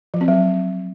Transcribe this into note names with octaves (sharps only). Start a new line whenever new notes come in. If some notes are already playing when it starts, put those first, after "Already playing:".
F3
C4
F#3